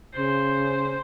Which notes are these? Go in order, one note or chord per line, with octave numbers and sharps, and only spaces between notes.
C#3 C5